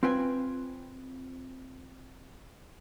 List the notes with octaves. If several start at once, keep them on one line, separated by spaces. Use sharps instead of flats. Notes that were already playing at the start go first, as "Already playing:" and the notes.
C4 F4 B4 G5 G#5